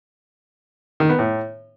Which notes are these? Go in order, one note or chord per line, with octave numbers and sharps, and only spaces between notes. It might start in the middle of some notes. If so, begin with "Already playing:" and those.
D#3
B3
A2